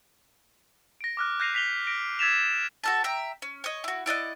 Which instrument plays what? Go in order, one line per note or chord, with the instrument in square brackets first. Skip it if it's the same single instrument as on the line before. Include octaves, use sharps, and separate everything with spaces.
[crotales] A#6 D7
D6 F6 F#6
F#6 G6 A#6 C7 D#7 F7
B6 F7 G7
A#6 B6 D7
E6 G#6 A6 B6 E7 F7
[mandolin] F#4 A4 A5
E5 G5 A#5
C#4
C#5 D#5
E4 F#4
E4 D5 D#5 F#5